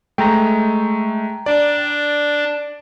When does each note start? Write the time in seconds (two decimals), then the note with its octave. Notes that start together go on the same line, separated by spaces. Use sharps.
0.18 G#3 A3 G5 A#5
1.46 D4 D5